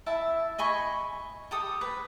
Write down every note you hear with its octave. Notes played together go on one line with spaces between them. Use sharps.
E4 E5 A5
D#5 G#5 B5 C#6
G4 A4 D#6
B4